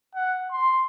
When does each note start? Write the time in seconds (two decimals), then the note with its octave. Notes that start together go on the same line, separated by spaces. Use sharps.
0.15 F#5
0.51 C6